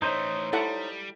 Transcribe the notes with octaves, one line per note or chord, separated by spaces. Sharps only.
E3 A3 D#4 C5 C#5 D#5
G3 E4 A4 F#5